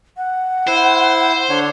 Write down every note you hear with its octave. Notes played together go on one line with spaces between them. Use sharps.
F#5
E4 C5
D3 D4 C#5